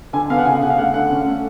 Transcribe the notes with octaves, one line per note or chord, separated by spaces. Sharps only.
D3 G#5
B3 F5
F#5
C#3 G#5
C#3 F#5
F5
A3 F#5
D3 F#5
C#4
A3